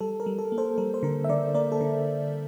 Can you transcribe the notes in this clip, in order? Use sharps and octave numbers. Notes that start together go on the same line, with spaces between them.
G3 A4
A#4
G3
A4
A#3
A4 C5
G3 A#4
C5
D3 A#4
E5
D3 A#4 D5
A#3 A#4 D5
A4
D3 A#4